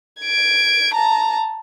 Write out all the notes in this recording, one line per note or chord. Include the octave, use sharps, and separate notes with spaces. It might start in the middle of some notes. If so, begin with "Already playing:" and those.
G#6 D7
A5 A#5